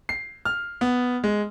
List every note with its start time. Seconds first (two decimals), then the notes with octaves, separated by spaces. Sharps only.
0.09 C7
0.45 F6
0.81 B3
1.24 G#3